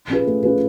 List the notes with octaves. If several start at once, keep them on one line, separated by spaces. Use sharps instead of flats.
C#4 F4 G#4 B4
A3
C#4 F4 G#4 B4